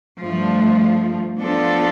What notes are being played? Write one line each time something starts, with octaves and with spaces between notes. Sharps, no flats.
G2 F3 A3
F3 B3 D4 A4